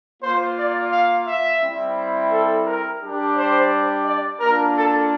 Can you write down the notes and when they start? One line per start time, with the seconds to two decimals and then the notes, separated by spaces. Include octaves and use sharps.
0.22 A#3 F4 C5
0.57 D5
0.92 F5
1.27 E5
1.62 G3 C4 E4
2.31 A4
2.66 A#4
3.01 G3 D4 G4
3.36 C5
4.06 D5
4.40 A#3 D4 F4 A#4
4.75 A4